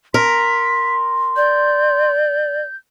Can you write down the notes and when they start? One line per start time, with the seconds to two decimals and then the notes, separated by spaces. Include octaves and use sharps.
0.14 A#4 C6 B6
1.36 D5 G6